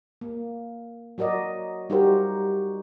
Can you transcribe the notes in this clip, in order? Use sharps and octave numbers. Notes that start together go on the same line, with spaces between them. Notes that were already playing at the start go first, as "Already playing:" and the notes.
A#3
F#3 F#4 A#4 D5 D#5
G3 D#4 F#4 G4 A#4 C5